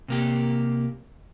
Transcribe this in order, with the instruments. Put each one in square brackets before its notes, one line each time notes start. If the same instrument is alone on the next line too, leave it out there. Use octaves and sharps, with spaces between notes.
[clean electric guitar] C3 A#3 G4